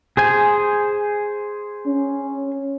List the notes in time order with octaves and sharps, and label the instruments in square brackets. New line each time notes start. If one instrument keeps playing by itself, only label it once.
[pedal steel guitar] G#4 C5 G#5
[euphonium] C#4